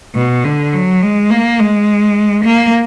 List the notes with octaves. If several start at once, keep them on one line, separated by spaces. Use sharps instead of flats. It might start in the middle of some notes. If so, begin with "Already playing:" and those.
B2
D3
F#3
G#3
A#3
G#3
A#3